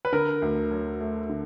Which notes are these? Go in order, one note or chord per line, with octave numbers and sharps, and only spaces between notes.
B4
D3 A#4
D2
F#3
A3
D3